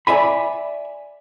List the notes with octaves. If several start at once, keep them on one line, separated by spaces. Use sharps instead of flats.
D5 E5 G#5 B5